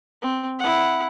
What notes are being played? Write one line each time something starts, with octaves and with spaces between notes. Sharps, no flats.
C4
E4 F#5